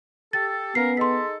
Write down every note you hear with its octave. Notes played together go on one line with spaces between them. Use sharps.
G4 A4 A6
A#3 B3 C#4 A#4 C7
D#4 G#4 A4 C6 B6